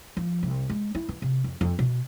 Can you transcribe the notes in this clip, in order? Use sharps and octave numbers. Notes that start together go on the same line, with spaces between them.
F3
C2
G#3
E4
E3
C3
F2
F2
B2